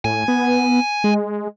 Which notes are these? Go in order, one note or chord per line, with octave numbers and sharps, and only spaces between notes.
A2 G#5
B3
G#3